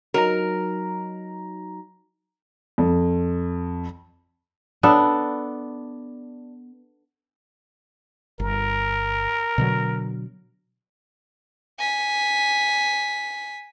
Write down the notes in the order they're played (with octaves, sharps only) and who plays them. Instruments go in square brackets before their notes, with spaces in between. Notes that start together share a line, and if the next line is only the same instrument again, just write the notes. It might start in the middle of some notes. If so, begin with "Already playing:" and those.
[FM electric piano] F#3 D#4 A#5 [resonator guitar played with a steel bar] A#4
[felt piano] F2
[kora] B3 D4 A4
[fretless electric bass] G1 [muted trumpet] A#4
[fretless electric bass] B2 D3 F#3
[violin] G#5 B6